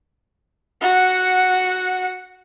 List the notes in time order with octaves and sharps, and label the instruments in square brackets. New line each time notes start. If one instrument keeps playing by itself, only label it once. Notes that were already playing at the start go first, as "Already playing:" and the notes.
[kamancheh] F#4 F#5